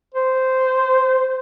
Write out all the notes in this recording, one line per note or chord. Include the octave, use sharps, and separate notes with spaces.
C5